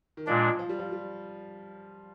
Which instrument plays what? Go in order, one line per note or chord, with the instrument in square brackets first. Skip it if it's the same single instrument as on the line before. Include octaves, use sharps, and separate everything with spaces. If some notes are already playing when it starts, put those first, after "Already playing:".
[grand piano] D#3
[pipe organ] A#2 G#3 D4 [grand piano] F3
[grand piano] F3
G3
F3
G3